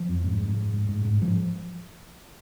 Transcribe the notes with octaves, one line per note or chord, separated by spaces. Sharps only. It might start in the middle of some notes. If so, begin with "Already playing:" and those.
Already playing: F3
F2
G#2
G#2
G#2
G#2
G#2
G#2
G#2 F3